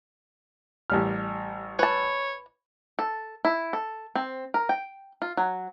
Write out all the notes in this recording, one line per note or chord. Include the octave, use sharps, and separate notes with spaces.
A1 G3 F6
B4 C#5 A5
A4
E4
A4
C4
A#4
G5
F4
F#3